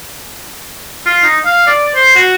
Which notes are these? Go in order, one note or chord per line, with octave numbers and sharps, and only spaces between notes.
F4
D#4
F5
D5
C5
F#4